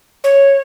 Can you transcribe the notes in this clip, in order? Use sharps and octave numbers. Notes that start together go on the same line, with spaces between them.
C#5